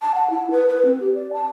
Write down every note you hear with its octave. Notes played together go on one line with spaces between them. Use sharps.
A5
F#5
E4
B4
B4
C4
G4
D5
A5